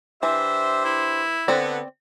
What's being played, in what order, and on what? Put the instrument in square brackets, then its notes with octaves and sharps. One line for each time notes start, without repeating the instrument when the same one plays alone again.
[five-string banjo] E3 [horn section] D4 G4 C5 [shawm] E5
[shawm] E4
[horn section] D3 B3 [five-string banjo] C4 D5